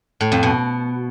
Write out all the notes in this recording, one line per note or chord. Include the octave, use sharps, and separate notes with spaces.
A2
F2
B2